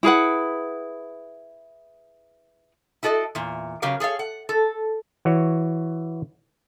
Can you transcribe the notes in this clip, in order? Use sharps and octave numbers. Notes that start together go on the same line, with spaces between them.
E4 G#4 B4 F#5
E4 F#4 A4 D5 D#5
E2 A#2
C#3 F#3 G4 A#4 F5
G#4 A4 C#5 F5
F#5
A4
E3 F#4 C#5